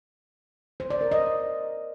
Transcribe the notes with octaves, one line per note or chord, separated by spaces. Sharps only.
C5
D5
A#4
D#5